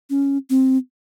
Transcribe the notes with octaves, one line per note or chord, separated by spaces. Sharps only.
C#4
C4